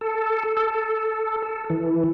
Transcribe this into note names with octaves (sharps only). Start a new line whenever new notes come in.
A4
A4
A4
E3